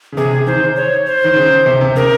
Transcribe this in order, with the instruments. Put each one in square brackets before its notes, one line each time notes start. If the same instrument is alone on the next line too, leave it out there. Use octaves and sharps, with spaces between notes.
[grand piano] C#3
[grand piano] C3 [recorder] G#4
[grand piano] D#3 [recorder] C5
[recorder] C#5
C5
[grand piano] D#3
C#3
C3
C3
[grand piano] C#3 [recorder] A#4